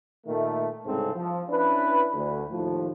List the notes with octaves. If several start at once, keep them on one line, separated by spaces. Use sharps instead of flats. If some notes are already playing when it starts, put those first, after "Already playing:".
A#2 D#3 A3
C2 G#2 C#3 C4 A4
F3
C#4 D4 E4 B4
D2
D#2 A2 F3